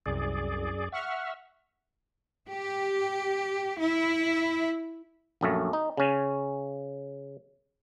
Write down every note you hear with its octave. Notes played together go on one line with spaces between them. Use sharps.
C2 F#2 G#4 D5
E5 F#5 C#6 F6
G4
E4
A#1 F#2 A3
D#4
C#3 C#4